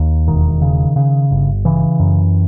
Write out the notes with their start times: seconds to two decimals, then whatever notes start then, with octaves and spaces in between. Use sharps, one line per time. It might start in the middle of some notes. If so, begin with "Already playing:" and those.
Already playing: D#2
0.27 E1 D#3
0.62 C#3
0.96 C#3
1.31 G1
1.65 C#3 E3
2.00 F#2